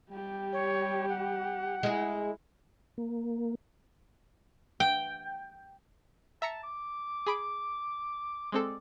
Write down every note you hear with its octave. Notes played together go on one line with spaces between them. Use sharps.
G3 G4
C#5
F#5
G#3 E4 G#4
A#3
G5
E5 A5 A#5 C#7
D6
G#4 B5 D7
G#3 C4 A4 D5